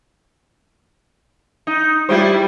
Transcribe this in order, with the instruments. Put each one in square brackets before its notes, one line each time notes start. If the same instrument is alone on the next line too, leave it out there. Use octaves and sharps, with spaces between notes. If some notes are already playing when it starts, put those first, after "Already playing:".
[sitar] D#4
[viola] G3 [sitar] E4 F4 C5